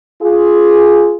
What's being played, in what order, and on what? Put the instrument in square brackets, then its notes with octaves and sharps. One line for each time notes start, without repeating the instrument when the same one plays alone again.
[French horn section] F4 G#4